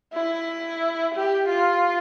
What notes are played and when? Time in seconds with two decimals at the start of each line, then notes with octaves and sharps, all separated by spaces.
0.13 E4
1.15 G4
1.49 F4